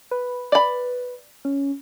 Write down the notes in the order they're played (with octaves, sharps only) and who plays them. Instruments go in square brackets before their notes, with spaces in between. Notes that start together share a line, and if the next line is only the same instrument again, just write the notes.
[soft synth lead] B4
[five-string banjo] D5 B5
[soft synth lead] C#4